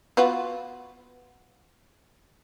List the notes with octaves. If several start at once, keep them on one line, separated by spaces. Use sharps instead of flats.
B3 F4 F#4